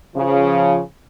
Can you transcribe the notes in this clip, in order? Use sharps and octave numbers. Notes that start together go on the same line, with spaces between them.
C#3 F3